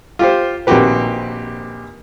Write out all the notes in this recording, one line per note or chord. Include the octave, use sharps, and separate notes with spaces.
F4 G4 C5
A#1 D#3 C4 F#4 G4 B4